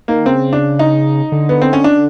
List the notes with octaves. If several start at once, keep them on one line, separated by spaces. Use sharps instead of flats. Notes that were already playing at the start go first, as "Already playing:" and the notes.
D#3 A#3
C#3 C4
D4
D#4
D3
B3
C4
C#4
D4